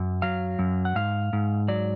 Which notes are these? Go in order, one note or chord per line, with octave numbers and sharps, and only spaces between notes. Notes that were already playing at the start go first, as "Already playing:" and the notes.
Already playing: F#2
F#3 F5
F#2
F#5
G#2 F5
G#2
F#3 D5